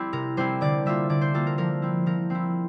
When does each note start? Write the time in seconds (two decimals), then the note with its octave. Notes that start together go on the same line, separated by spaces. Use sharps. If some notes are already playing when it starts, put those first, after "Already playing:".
Already playing: G3 C4 E4
0.13 C3 A#4
0.37 G3 C4 E4 C5
0.61 D3 D5
0.86 G3 A#3 F4 E5
1.09 D3 D5
1.21 C5
1.34 G3 A#3 F4 A4
1.47 A#4
1.58 F3 A#4
1.82 C4 E4
2.06 F3 A#4
2.30 C4 E4